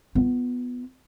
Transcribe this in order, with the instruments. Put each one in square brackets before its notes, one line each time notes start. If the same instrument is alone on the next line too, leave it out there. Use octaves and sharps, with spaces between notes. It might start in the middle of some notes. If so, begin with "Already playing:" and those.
[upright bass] B3 F4